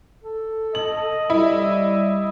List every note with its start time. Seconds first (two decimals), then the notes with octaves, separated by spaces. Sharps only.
0.24 A4
0.75 D#5 F#7
1.30 G3 E4